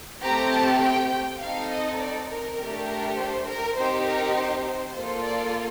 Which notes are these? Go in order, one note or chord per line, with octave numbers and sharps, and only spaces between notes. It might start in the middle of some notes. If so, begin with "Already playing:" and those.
A3 C4 G4 A#5
A5
G5
G5
C4 D#4 A4 F5
D#5
D5
A#4
A3 D4 G4
A#4
C5
A#4
C4 D#4 G4 C5
A#4
C5
C5
A#3 F4 A4
D5